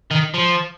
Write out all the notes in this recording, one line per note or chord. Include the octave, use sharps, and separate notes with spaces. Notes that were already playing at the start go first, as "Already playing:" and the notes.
D#3
F3